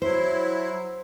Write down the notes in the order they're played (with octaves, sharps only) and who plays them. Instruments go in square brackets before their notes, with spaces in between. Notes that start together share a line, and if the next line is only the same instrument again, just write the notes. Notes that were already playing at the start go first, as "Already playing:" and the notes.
[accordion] F#3 E4 [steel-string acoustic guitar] C5